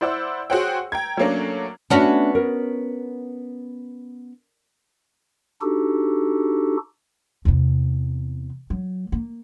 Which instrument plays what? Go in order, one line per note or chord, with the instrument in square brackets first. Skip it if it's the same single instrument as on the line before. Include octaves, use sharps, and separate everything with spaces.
[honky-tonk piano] E4 C5 D5 F#5 E6
F#4 G#4 C5 C#5 F#5 G5
G5 A#5 G#6
F#3 A3 A#3 C#4 D4
[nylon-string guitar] A3 D4 A5 [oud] B3 C#4 F#4
[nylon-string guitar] A#4
[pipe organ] D4 D#4 F#4 G4 A4
[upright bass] E2 C3
F#3
A#3